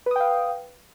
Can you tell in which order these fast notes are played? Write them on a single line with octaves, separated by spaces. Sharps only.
B4 D#6 G5 F5